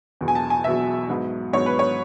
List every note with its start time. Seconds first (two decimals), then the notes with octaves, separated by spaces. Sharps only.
0.21 E1 E2 B2 F#3
0.28 G#5
0.35 A5
0.50 G#5
0.64 E1 E2 B2 F#3 E5
1.09 G#2 F#3 B3
1.53 G#2 F#3 B3 C#5
1.66 B4
1.79 C#5